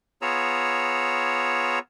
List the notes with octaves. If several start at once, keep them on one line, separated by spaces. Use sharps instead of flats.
B3 F4 G#4 C#5 A#5 E6